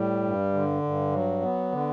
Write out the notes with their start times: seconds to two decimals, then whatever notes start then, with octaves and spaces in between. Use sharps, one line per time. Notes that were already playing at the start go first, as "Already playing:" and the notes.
Already playing: A2 G3
0.23 G2
0.53 D3
0.83 G2
1.12 F#3
1.42 B3
1.72 D3